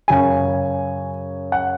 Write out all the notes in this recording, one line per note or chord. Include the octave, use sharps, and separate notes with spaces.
F#2 C#3 F#3 G#5
F#5